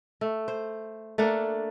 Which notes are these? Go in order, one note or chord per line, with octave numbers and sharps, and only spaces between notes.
A3
C5
A3 A#3 D4 F#5